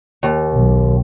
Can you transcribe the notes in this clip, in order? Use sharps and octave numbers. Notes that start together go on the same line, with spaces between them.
D#2
B1